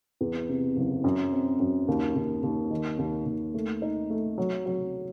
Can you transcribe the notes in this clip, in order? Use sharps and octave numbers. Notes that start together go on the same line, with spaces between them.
E2
C3
F#1
F#2
C4
F#2
D#2
D#2
D#2
D#3
D#2
D#2
A3
D#4
A3
F#3
F#3